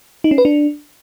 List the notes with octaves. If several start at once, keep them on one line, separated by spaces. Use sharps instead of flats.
D#4
C#4
B4
D4